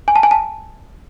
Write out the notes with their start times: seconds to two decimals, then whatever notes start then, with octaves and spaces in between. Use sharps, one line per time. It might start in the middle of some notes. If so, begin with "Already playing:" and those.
0.08 G#5
0.16 A5
0.23 G#5
0.31 A5